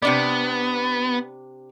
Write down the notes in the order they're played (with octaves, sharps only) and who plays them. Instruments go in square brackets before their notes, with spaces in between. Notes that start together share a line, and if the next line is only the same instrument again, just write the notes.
[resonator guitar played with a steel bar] C3 D4 D5 [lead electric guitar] B3